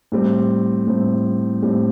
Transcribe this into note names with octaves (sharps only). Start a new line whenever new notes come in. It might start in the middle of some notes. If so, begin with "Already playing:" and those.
A2 G3 C4
A2 G3 C4
A2 G3 C4